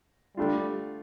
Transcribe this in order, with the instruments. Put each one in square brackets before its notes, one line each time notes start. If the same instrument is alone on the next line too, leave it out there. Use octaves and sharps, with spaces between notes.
[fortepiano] D3 A3 D4 F4 [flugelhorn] G3